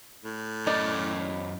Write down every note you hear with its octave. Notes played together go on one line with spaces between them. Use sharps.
A2
F#2 C#4 D#4 D5 D#5